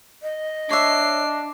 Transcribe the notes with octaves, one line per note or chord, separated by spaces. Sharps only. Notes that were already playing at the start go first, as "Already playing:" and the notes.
D#5
D4 C#5 E5 C7